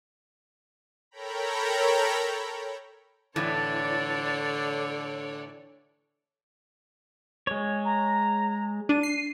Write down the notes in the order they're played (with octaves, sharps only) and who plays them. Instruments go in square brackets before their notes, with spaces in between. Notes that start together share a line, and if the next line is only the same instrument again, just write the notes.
[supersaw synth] A4 A#4 C#5 G5 A#5 B5
[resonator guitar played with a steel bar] A2 E3 [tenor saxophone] D3 [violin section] A4 C#5 D5 [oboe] A5
[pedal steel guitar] G#3 C#5
[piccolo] A#5
[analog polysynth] D4 [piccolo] D#7
[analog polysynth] C7